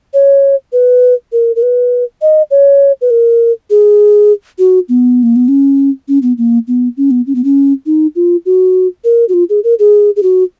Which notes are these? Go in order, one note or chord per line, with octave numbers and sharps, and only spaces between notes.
C#5
B4
A#4
A#4
B4
D#5
C#5
B4
A#4
G#4
F#4
B3
A#3
B3
C#4
C#4
B3
A#3
B3
C#4
B3
C#4
B3
C#4
D#4
F4
F#4
A#4
F#4
F4
G#4
A#4
G#4
G#4
F#4